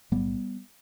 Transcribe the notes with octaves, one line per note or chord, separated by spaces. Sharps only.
B1 A2 G3 B3